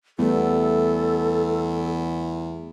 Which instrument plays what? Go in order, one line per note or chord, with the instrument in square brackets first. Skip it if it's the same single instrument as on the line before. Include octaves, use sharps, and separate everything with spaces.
[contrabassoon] E2 [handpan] G3 A3 B3 [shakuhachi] A4